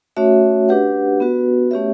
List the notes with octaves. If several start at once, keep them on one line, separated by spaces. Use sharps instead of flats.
A3 C#4 F#4 C#5 E5
D4 G4 B4 F#5
B3 F#4 B4
A3 C#4 G4 C#5 E5